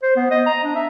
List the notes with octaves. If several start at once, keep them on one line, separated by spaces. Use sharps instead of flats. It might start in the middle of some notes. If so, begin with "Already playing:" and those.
C5
B3
D#5
A#5
D4
E5